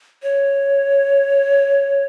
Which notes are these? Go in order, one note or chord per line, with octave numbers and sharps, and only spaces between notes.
C#5